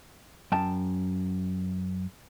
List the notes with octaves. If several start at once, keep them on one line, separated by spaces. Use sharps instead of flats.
F#2 G5 A5